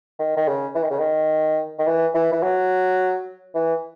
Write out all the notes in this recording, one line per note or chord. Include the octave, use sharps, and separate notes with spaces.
D#3
D#3
C#3
E3
D#3
C#3
D#3
D#3
E3
E3
E3
F#3
E3